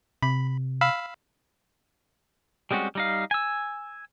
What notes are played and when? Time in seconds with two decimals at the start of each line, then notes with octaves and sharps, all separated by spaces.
0.23 C3 B5
0.81 F5 B5 E6
2.71 G3 G#3 C4 C#4 F#4
2.95 G3 D#4 F5
3.31 G#5 E6